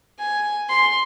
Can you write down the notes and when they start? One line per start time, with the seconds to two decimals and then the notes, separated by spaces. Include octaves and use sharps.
0.19 G#5
0.69 C6